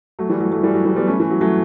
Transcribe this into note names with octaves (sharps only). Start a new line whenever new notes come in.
F#3 A3
E3 G3
F#3 A3
F#3 A3
E3 G3
F#3
E3 G3
G3 B3
A3 C#4
E3
F#3
F#3 A3